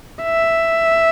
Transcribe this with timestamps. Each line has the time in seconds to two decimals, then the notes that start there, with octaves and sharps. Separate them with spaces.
0.23 E5